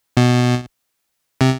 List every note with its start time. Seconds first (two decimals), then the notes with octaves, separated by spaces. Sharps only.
0.17 B2
1.41 C3